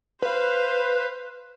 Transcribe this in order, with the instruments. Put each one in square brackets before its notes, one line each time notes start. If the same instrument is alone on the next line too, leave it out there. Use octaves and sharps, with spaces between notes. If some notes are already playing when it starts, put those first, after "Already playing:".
[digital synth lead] B4 [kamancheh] C5 F5